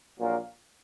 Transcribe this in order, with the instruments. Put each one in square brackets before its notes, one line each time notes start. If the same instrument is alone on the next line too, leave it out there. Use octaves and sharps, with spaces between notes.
[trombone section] A#1 A#2 F#3 A#3